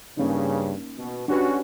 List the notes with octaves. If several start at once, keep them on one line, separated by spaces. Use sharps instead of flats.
G2 C#3 A#3 C#4 D#4
B2
C#4 D4 F#4 G4 B4